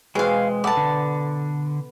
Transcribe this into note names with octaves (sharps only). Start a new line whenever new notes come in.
B2 E3 G#3 C4 G#4 F5
B3 A4 D5 A5
D3